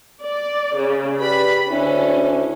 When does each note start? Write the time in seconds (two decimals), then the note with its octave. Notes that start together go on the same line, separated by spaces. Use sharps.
0.22 D5
0.77 C#3
1.20 G4 B4 D5 B5
1.69 D2 C#4 D4 E4